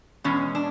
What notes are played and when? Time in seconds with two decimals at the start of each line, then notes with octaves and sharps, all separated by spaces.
0.24 E2 B2 G#3 C#4
0.55 D4